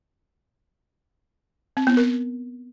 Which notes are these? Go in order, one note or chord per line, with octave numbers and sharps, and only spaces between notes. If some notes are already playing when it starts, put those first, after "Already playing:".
C4
B3
A#4